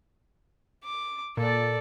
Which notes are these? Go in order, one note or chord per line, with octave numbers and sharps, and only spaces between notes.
D6
A#2 A4 D5